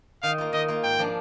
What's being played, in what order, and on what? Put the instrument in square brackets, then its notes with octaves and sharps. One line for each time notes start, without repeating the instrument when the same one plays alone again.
[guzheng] D#3 [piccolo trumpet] F5
[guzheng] A#3 F4
[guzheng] D#3 [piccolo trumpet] D#5
[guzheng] A#3 F4
[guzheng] G#2 [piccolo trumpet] G5
[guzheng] F3 A#3 D4